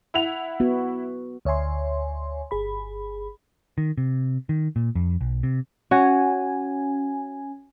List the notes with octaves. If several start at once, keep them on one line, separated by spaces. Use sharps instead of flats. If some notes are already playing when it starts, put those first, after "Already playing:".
E4 F#5 F7
B3 F#4
D2 C#5 E5 G#5 C6
G1 G#4 B5
D#3
C3
D#3
A#2
F2
B1
C3
C#4 F#4 G#5